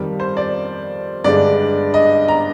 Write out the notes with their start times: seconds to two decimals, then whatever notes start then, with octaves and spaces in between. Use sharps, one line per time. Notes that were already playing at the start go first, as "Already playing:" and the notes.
Already playing: F2 D#3 G3
0.20 C5
0.37 D5
1.24 G2 D3 G#3 D5
1.94 D#5
2.28 A#5